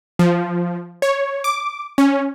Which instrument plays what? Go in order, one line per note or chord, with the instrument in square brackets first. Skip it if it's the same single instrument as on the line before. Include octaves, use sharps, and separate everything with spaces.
[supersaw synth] F3
C#5
D6
C#4